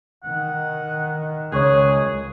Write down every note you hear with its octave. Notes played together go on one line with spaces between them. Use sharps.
D#3 F#5
C#2 G#4 C#5 C#6 F#6